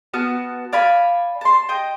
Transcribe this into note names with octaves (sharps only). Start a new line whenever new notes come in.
B3 F#4 A5 F6
D5 F5 G#5 B5
A5 C6
D#5 G5